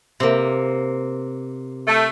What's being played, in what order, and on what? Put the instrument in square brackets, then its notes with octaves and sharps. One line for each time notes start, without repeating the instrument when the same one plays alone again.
[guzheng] C3 A#3
[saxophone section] A3